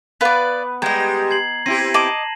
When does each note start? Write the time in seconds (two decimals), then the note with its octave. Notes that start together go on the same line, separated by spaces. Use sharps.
0.21 B3 B4 D5 F5
0.82 G3 G#3 D#5 G5 A#5 G#6
1.31 G#6 C7 F#7
1.66 C4 E4 G4 A#6 C7 D#7
1.94 D#5 A5 D6 E7 F#7